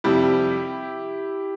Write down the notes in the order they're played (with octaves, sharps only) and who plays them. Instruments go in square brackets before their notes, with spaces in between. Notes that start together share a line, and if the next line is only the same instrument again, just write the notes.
[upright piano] F2 C3 G3 [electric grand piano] E4 G4